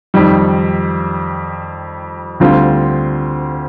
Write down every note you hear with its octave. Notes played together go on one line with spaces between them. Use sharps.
F2 D#3 G3
D2 D3 G3 C4 F4